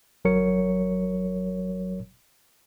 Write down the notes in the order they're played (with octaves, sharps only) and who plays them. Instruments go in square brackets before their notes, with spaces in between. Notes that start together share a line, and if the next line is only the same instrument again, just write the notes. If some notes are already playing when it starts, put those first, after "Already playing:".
[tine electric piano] G1 F#3 A#4 C#5 C#7